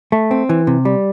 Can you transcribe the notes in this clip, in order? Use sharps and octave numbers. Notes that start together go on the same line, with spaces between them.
A3
C4
E3
C3
G3